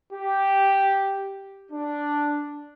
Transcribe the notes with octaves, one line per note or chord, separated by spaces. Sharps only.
G4
D4